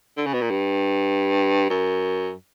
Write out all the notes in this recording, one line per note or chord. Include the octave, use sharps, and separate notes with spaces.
D3
C#3
B2
A#2
G2
F#2